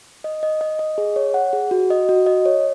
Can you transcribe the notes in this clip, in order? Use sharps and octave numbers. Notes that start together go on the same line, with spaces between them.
D#5
D#5
D#5
D#5
G#4
C#5
F#5
G#4
F#4
D#5
F#4
D#5
C#5